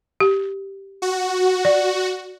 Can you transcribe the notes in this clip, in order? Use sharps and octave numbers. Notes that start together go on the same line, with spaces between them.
G4
F#4
D5